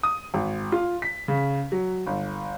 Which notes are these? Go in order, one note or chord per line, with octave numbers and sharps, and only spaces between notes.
D#6
G#1
F4
B6
C#3
F#3
G1